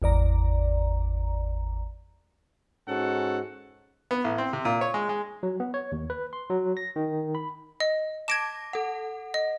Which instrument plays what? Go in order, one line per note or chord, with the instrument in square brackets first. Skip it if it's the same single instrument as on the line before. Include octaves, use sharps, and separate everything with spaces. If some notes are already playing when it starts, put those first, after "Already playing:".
[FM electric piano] G#1 E2 D5 A#5
[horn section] G#2 C#4 F#4 A4 F#5
[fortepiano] B3
A1
C4
C3
A#2
C#5
G#3
G#3
[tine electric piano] F#3
B3
C#5
D#2
B4
C6
F#3
A#6
D#3
B5
[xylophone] D#5
[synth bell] A5 D6 A#6 [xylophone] G#6 D7 E7
[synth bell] A4 F#5
[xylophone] D#5